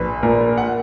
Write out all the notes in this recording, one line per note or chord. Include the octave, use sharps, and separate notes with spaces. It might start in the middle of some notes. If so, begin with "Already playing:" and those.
Already playing: A#1 B4
A#2 A#4
F#5